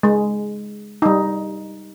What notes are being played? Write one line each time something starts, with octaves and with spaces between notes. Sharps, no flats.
G#3
G3 D#4